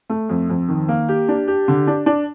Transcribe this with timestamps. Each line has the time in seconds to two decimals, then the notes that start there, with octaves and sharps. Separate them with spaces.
0.09 A3
0.29 F2
0.49 F2
0.68 D#3
0.89 A#3
1.09 G4
1.29 D4
1.48 G4
1.68 D3
1.87 D4
2.06 D4